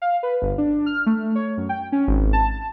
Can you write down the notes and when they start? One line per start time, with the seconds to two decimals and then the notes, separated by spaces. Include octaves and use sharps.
0.02 F5
0.23 B4
0.42 G1
0.58 D4
0.86 F6
1.06 A3
1.35 C#5
1.57 F#2
1.69 G5
1.92 C#4
2.07 G#1
2.33 A5